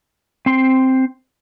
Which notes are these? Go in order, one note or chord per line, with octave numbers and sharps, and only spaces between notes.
C4 C6